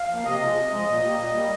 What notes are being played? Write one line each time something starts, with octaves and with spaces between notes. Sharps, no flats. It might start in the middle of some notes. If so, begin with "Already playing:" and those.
Already playing: F5
F3
A#3
C3 D#5
F3 G#3
C3
F3 G#3
A#2
G3 A#3
A#2
G3 A#3